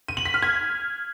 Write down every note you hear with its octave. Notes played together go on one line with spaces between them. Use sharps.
D#7
F#7
B6
F6
G#6